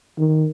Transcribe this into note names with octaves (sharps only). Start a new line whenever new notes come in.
D#3